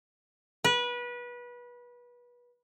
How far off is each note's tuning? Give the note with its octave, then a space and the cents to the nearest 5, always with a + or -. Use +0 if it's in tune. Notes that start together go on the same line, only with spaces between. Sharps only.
B4 -25